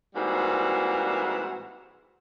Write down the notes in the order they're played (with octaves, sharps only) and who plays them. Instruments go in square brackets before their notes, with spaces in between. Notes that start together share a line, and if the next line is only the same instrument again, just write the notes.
[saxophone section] G#2 E3 G3 A#3 C4 F#4